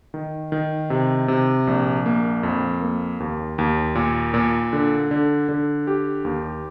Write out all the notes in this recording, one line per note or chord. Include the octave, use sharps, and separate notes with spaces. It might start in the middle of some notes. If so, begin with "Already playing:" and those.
D#3
D#3
C3
C3
A#1
A#3
F2
A#3
D#2
D#2
A#2
A#2
D3
D3
D3
G4
D#2